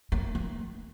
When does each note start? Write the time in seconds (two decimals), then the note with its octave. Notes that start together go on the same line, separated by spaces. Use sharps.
0.12 A#3
0.35 A#3